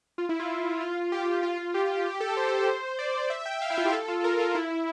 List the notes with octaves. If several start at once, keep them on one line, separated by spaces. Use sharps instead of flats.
F4
E4
F4
F4
F4
G4
G4
F4
F4
G4
G4
A4
C5
D5
D5
E5
G5
F5
E4
F4
G4
A4
F4
A#4
F4
E4